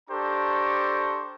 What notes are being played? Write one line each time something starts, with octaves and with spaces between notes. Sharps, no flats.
D4 G4 A4 C5 A#5 C#6